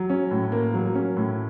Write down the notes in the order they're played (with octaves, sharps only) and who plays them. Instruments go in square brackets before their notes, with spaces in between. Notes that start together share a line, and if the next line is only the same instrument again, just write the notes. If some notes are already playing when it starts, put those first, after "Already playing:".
Already playing: [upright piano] F#3
C#4
A2
A#3
F#3
C#4
A2